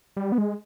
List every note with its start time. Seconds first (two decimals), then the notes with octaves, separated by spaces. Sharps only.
0.16 G3
0.32 B3
0.38 G#3